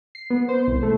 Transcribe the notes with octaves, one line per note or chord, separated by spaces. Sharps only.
C7
B3
C5
C2
A3